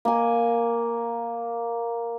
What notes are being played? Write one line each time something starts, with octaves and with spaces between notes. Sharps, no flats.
A#3 G#5